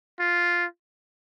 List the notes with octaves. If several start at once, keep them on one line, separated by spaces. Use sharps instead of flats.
F4